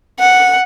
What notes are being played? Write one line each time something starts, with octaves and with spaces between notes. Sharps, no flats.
F#5